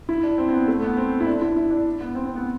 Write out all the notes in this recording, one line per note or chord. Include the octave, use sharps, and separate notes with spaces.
E4
D4
C4
C4
B3
A3
B3
C4
E4
D4
E4
E4
D4
B3
C4
C4
B3